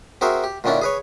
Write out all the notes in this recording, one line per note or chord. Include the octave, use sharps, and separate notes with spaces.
C4 F#4 G#4 A#4 E5
G4
A#2 D3 D#3 C#4 D4 E4
G#4 B4 C#5